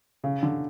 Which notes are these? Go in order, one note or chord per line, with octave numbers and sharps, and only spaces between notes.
C#3
D3